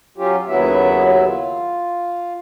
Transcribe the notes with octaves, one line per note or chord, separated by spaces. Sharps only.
F#3 C#4 F4 G4
D#2 C#3 F#3 B3 E4 E5
F4